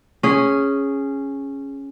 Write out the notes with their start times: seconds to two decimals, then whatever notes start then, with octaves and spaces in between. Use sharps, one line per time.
0.23 C#4 G#4